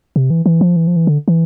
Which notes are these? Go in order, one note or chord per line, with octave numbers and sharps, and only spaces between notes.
C3
E3
E3
F3
E3
F3
E3
D3
E3